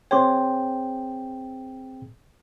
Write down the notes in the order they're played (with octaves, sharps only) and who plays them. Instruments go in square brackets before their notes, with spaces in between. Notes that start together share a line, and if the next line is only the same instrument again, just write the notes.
[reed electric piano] C4 G#4 G5 [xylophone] C#5 C6 D6